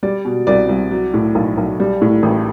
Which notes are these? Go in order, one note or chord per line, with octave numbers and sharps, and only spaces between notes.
G3 D5
B2
C2 D5
C2
F#3
A2
B1
B1
G3
A2
A1